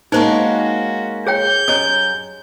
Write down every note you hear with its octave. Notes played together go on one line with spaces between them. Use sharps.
G#3 A#3 C#4 D#4 F#4 C5
G#4 C#5 G5 G6
F#2 C#5 D#5 D#6